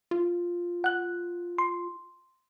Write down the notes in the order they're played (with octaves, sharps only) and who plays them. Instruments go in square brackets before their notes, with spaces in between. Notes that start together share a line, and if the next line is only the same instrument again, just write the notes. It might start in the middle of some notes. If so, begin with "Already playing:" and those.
[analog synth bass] F4
[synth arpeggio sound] F#5 F#6
C6